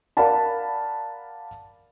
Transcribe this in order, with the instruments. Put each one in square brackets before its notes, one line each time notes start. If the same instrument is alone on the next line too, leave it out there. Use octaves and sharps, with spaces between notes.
[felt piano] A#4 D5 F5 F#5 A5 B5